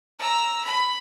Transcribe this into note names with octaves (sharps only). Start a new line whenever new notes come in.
A#5 E6
B5